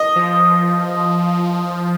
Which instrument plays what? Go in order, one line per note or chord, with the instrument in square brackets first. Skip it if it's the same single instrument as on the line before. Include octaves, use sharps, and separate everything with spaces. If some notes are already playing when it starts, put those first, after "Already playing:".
Already playing: [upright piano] D#5
[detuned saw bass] F3